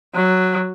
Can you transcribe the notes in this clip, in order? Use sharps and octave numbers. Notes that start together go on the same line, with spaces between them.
F#3